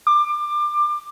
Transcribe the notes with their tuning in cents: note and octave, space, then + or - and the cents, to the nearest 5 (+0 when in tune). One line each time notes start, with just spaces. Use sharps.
D6 +25